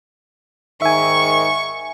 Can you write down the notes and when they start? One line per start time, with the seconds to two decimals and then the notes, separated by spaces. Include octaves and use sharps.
0.82 G#2 D#3 E5 G#5 C#6